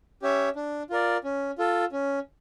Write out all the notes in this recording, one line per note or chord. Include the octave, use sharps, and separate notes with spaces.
C#4 G4 C#5 E5
D4
F4 A#4 D5
C#4
F4 A4
C#4